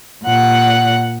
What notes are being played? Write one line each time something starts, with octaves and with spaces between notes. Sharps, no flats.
A#2 F#5